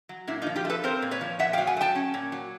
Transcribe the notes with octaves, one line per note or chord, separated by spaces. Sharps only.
F#3
A#2 D4 E4
D#4 F4
F3
F4 G4
A3
A4 B4
C4 A#4 C5
A#2
B4 C#5
F3
A#2 E5 F#5
F5 G5
F#3
F#5 G#5
A3
G5 A5
C#4
A#2
F#3